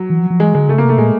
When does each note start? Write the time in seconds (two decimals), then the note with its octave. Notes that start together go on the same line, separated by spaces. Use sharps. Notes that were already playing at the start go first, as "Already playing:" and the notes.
Already playing: F#3
0.10 E3
0.20 F3
0.30 F3
0.39 E3 G#3
0.55 D3 G#3
0.68 C#3 A3
0.78 A#3
0.84 C3 A3
0.98 A#2 G#3